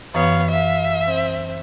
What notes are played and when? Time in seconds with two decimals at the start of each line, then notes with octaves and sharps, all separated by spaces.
0.14 F#2 E3 B3 C#5 F5 D#6
0.51 E5 F5
1.07 C4